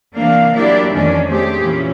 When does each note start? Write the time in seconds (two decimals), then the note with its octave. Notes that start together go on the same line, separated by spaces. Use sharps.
0.15 C3 E3 A#3 D4 F5
0.55 F#3 A#3 D4 E4 G4 D5
0.93 F2 A2 D#3 E3 C#4 D4
1.26 A3 C4 G4 G#4
1.60 A#2 E3 C#4